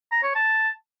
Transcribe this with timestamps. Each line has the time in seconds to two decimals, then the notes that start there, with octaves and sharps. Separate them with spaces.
0.11 A#5
0.23 C#5
0.35 A5